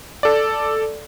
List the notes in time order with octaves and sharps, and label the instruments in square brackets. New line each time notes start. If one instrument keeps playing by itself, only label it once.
[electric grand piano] A4 D5